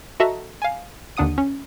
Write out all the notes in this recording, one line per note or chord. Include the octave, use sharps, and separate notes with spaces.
F#4 A4 D#5 E5 A5 A#5
F5 G#5
D#2 D3 D4 F#5 D#6 D#7
C#4